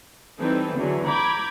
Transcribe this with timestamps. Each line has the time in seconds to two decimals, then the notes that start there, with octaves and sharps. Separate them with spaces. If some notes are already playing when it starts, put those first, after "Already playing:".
0.39 E3 G3 C4 D#4 A4 B4
0.75 E2 D3 E3 F#3
1.05 A#5 B5 D6 G6 G#6